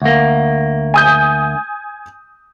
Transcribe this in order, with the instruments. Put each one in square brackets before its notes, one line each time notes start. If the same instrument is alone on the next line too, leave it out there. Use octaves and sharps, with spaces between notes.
[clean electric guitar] D2 A#3
[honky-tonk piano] G#5 D#6 G6